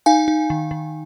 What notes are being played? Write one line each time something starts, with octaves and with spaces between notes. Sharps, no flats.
D#4 F5 G#5
D#4
D#3
D#3